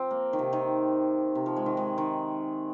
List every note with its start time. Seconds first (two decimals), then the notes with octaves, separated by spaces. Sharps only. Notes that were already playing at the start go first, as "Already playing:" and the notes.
Already playing: F3 C4
0.11 A#3
0.33 D#3
0.39 C3
0.53 D#3
1.35 C3
1.46 F3
1.56 G#3
1.66 D#3
1.77 G#3
1.98 D#3